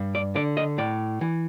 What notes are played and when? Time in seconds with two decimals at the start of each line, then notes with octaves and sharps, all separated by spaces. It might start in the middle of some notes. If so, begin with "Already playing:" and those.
Already playing: G2
0.15 D5
0.35 D3 D5
0.57 D#5
0.78 A2 D5
1.21 E3